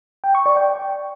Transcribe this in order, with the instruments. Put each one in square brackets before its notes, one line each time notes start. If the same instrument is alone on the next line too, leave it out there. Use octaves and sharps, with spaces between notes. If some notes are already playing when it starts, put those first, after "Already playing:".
[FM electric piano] G5
C#6
D5
G5